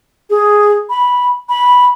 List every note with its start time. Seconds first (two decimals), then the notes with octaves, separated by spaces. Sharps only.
0.30 G#4
0.90 B5
1.49 B5